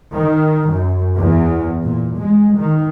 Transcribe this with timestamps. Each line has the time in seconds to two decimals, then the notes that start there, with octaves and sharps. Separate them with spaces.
0.14 D#3
0.70 F#2
1.18 E2
1.83 A#2
2.18 G#3
2.56 D#3